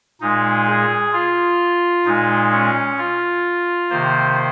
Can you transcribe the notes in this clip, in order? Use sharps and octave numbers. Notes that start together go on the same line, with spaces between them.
A#2 G#3 D#4
G#4
F4
A#2 G#3 D#4
C#4
F4
C3 D#3 A#3 C5